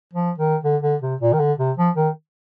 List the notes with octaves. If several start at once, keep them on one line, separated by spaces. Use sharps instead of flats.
F3
D#3
D3
D3
C3
A#2
D#3
D3
C3
F3
D#3